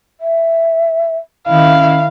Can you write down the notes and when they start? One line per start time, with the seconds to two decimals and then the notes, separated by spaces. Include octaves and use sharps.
0.21 E5
1.48 D#3 C#4 E4 F5